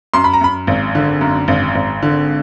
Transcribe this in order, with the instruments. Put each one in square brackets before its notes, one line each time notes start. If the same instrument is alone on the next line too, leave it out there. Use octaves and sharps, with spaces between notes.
[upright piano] F#2 C6
B5
A#5
F#2 B5
G#1
D3
F#2
G#1
G#1
D3